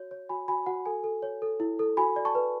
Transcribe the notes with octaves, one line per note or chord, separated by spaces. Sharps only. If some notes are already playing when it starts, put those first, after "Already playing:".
Already playing: F#4 C#5
C#5
F#4 G#5 B5
F#4 G#5 B5
F#4 F#5
A4 G#5
A4
C#5
A4
E4
A4
F#4 G#5 B5
D5
A5 C#6
B4